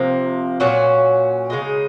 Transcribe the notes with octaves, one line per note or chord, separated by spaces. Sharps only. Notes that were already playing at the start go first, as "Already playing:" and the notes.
Already playing: C3 F3 A#3
A#2 F#3 C#4 F#4
C#3 G#3 D#4